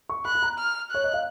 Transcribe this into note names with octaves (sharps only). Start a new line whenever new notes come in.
C#6
B5 F#6
B5
A#5
F6
C#5 F#6
D#5
F5